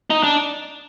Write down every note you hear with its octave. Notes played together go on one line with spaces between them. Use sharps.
D#4
D4